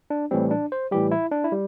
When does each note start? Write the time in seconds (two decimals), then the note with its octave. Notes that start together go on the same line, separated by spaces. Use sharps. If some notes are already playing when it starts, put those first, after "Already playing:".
0.10 D4
0.31 A2 E3 G3 C4
0.51 D4
0.72 C5
0.91 A2 E3 G3 G4
1.11 E4
1.31 D4
1.44 E4
1.52 G3